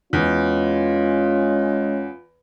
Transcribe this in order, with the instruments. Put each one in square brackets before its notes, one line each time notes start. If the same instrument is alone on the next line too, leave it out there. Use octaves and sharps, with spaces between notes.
[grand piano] E2 [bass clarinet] G#3 [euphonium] C#4 [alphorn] F4